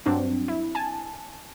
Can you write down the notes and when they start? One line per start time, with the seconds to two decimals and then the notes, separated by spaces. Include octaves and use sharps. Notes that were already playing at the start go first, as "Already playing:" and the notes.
0.06 G2 F#3 C4 D4 F#4
0.48 E4
0.75 G#5 A5